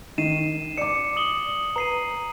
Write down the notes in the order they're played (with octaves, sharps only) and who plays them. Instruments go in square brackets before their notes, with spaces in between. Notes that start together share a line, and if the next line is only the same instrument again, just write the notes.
[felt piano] D#3 [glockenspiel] C7 D#7 E7
[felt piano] D5 D6 [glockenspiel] C#7
[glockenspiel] D#6 F#7 G7
[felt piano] B4 [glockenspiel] A#5 C7 D#7